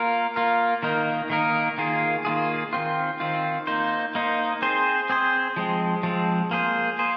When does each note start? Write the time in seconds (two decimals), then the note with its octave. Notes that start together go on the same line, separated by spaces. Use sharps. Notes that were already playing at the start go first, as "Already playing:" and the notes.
Already playing: A#3 F4 A#4
0.36 A#3 F4 A#4
0.83 D#3 A#3 D#4 A#4
1.30 D#3 A#3 D#4 A#4
1.78 D#3 A#3 F4 G#4
2.25 D#3 A#3 F4 G#4
2.73 D#3 C4 F4
3.20 D#3 C4 F4
3.67 A#3 D#4 C5
4.15 A#3 D#4 C5
4.62 C4 G#4 C5
5.09 C4 G#4 C5
5.56 F3 G#3 C4
6.03 F3 G#3 C4
6.51 A#3 G#4 C5
6.99 A#3 G#4 C5